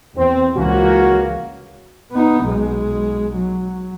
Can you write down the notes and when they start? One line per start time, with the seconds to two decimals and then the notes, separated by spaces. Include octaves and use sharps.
0.17 E2 C4
0.56 C#2 E3 A#3 C#4 F#4
2.12 B3 D#4
2.46 B1 G#3
3.36 F#3